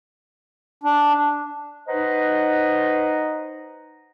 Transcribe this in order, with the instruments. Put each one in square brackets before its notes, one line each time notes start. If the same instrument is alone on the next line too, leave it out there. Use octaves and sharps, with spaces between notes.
[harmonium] D4
[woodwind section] D#4 B4 C5 D#5 F#5 A#5